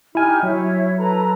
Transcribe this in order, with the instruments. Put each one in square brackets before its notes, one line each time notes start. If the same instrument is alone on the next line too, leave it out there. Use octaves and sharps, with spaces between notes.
[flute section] D#4 G4 F6 [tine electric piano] E4 G#5
[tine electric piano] F#3 [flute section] E4 C#5
[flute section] A4 B4 A#5